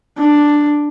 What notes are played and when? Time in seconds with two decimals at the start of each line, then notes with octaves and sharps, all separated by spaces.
0.18 D4